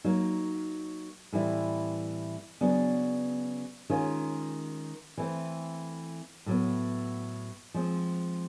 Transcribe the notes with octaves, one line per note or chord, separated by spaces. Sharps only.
F#3 A#3 D#4
A2 E3 G3 C4 E4
C#3 F#3 B3 D4
D#3 G#3 C#4 F4
E3 A3 C4
A2 F#3 B3
F3 G#3 C4